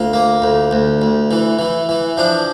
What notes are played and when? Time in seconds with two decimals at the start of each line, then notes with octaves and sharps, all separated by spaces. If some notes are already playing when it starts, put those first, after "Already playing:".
Already playing: D2 F4
0.13 A#3
0.42 D2
0.71 D2
1.02 D2
1.31 E3
1.59 E3
1.89 E3
2.17 F3 D4